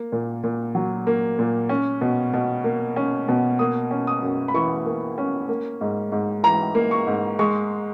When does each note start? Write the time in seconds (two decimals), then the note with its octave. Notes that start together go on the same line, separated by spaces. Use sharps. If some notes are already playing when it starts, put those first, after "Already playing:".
Already playing: A#3
0.12 A#2
0.44 A#2
0.75 F#3
1.07 A#3
1.39 A#2
1.69 C#4
2.01 B2
2.34 B2
2.64 A#3
2.96 C#4
3.29 B2
3.59 A#3 D#6
3.91 C#4
4.07 D#6
4.23 F#2
4.48 B5
4.54 E3 C#6
4.85 A#3
5.18 C#4
5.49 A#3
5.81 G#2
6.12 G#2
6.43 E3 A#5
6.75 A#3
6.91 C#6
7.07 G#2
7.39 G#3 C#6